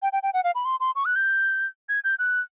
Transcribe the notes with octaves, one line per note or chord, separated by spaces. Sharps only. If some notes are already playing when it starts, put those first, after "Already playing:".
G5
G5
G5
F#5
F5
B5
C6
C6
C#6
F#6
G6
G#6
G6
F#6